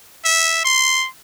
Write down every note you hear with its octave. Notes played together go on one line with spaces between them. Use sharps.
E5
C6